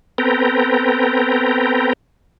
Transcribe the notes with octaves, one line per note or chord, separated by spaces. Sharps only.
B3 C4 A4 B4 G5 A#5